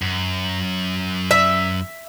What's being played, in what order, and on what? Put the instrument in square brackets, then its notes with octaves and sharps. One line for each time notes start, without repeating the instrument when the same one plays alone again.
[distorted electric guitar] F#2
[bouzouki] E5